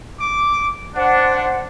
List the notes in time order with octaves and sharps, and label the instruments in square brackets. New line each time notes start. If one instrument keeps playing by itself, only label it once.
[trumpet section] D6
[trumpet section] D4 [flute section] C5 F#5